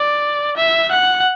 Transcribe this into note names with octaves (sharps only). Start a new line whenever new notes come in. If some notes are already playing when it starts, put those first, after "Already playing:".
Already playing: D5
E5
F#5